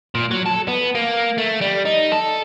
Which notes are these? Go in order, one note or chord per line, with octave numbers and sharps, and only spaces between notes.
A#2
F#3
A4
B3
A#3
A3
G3
D#4
A4